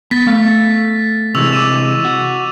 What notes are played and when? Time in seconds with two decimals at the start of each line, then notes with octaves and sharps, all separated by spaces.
0.11 B3 A6 B6
0.27 A3 F5
1.35 C3 E3 G#3 C#6 E6 F7
1.52 D6 D#7 E7
2.05 F#4